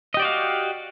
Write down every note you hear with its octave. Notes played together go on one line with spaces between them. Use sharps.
F#4 G4 D5 D#5 F5